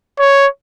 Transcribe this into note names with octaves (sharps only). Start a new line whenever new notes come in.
C#5